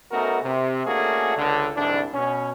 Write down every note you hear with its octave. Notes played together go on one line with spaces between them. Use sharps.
A3 B3 C#4 D#4 F#4 A#4
C3
A3 A#3 C#4 D4 F#4 G#4
C#2 D3
C2 G#2 D3 E3 D4
B2 C#4